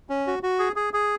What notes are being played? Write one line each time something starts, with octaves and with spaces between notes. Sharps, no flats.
C#4
F#4
F#4
G#4
G#4
G#4